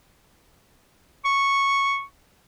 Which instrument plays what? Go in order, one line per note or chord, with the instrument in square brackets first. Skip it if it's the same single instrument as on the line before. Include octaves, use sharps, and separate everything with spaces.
[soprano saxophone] C#6